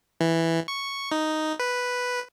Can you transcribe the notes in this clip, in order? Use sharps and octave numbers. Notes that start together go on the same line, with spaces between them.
E3
C#6
D#4
B4